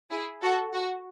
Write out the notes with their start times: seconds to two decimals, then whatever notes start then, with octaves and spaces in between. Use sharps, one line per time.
0.11 E4 G#4
0.42 F#4 A4
0.73 F#4